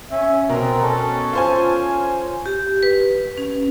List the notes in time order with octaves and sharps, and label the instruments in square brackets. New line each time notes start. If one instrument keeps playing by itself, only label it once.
[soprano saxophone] C#4 [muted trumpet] E5
[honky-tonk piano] B2 [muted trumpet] C4 [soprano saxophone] A#4
[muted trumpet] C#4 [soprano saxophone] A4
[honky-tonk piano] F4 C5 G#5
[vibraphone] G4
B4
C#4